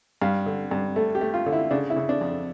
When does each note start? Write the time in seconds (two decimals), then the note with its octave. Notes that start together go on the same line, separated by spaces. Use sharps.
0.21 G2 F5
0.46 D3
0.71 G2
0.96 A3 A4
1.15 G4
1.21 A3
1.34 F4
1.46 D3
1.53 E4
1.71 C#3 D4
1.90 E4
1.96 C#3
2.09 D4
2.21 F2